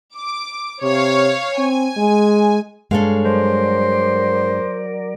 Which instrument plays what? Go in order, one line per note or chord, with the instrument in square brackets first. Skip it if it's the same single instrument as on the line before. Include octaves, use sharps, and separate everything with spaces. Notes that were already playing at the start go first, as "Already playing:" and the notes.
[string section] D6
[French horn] C3 [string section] C#5 F5
[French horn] C4 [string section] G#5
[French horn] G#3
[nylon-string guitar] G2 G#3 [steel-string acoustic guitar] A4 C#5 F5
[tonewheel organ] F#3 A#4 D5 [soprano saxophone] C5